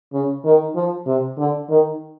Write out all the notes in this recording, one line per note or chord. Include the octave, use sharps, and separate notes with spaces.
C#3
D#3
F3
C3
D3
D#3